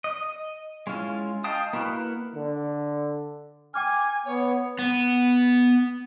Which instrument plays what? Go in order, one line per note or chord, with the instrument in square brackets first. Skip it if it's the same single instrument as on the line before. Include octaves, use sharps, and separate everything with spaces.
[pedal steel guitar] D#5
G#3 C#4 E4 F4
D#5 F5 G5 A5 D#6
A#3 E4 F#4 A#4 B4
[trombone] D3
[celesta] G5 D6 F6 [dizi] G#5
[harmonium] B3 [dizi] C#5
[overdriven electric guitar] B3